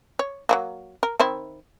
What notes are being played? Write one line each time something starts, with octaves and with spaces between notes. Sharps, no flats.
C#5
F#3 A3 A#3
A#4
D#3 C4 E4